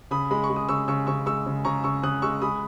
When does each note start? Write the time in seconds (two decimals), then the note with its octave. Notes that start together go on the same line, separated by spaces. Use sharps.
0.11 C#3 B5 D#6
0.31 G#3 B5
0.44 C#6
0.50 G#3
0.56 D#6
0.69 C#3 C#6 E6
0.88 C#3 C#6 E6
1.07 C#3 C#6 E6
1.26 G#3 C#6 E6
1.46 C#3
1.65 C#3 A#5 C#6
1.84 C#3 C#6 E6
2.03 C#3 D#6 F#6
2.22 G#3 C#6 E6
2.42 G#3 B5 D#6